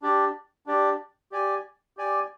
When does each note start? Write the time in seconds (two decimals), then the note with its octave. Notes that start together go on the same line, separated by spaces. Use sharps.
0.02 D4 G4 D5
0.66 D4 G4 D5
1.32 G4 D5 G#5
1.97 G4 D5 G#5